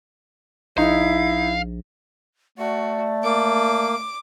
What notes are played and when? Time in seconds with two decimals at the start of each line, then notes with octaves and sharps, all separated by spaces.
0.78 A#1 D#4 E4 F5
2.58 A3 F#4 D5
3.24 A#3 D6